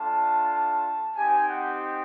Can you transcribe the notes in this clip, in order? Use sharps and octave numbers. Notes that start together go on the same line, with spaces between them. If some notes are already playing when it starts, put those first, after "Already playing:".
Already playing: A3 D4 F4 A5
A5
C4 D#4 G4 G#5
F#5